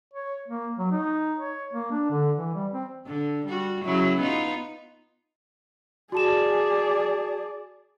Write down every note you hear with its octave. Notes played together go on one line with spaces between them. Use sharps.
C#5
A#3
F#3
D#4
C#5
A#3
D4
D3
E3
G3
C4
D3
G3 F#4
C#3 F#3 E4
B3 D#4 F4
F#4 G#4 D5 A5 E7